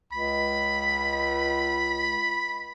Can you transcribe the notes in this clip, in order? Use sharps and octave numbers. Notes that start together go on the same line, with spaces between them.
C#2 B5